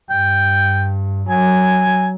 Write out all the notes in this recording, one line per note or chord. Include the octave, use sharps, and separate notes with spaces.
G2 G5
F#3 G#5